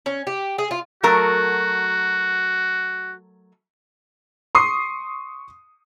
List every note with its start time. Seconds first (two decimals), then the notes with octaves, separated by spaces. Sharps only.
0.06 C#4
0.27 G4
0.58 G#4
0.71 F4
1.03 F#3 A3 F#4 A#4
4.55 C6 C#6 D#6 C7